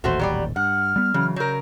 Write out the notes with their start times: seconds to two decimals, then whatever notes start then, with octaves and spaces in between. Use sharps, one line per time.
0.04 D#1 A1 D#2 A3 F#4 C5
0.19 F#3 G3 D5
0.56 G2 F#5 F6
0.96 G3 B3
1.14 C#3 E3 F#3
1.36 C#3 F#3 A#4 G6